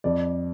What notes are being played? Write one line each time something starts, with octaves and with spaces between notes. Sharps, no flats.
F2 D5